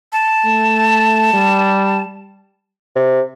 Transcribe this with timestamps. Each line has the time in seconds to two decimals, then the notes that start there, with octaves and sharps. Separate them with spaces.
0.13 A5
0.45 A3
1.34 G3
2.96 C3